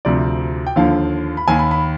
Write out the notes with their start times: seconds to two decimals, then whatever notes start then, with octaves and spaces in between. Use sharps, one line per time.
0.05 D2 C3 F3 D5
0.67 G5
0.76 D#2 D3 F3 F5
1.37 B5
1.48 D#2 D#3 G#5
1.59 B5
1.71 B5